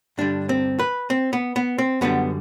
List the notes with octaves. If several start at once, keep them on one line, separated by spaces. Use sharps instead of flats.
G2 D3 G3 D4
C4
B4
C4
B3
B3
C4
F#2 D3 G3 B3